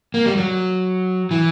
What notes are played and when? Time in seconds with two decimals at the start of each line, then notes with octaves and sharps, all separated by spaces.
0.14 A#3
0.26 G3
0.37 F#3
1.31 E3